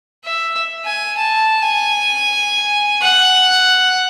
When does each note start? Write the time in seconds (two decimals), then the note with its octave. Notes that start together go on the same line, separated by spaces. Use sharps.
0.25 E5
0.85 G#5
1.17 A5
1.62 G#5
3.01 F#5